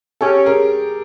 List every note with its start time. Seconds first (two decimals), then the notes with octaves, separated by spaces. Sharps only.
0.21 C#4 G4 A4
0.46 G#4 A#4